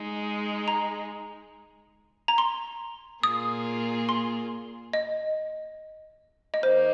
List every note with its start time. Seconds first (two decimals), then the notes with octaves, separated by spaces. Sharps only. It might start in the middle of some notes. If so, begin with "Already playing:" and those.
Already playing: G#3 D#4 G#4
0.68 A#5
2.28 A#5
2.38 C6
3.23 A#2 A#3 F4 G#4 D#6
4.09 C6
4.93 D#5
6.54 D#5
6.63 D#3 A#3 C5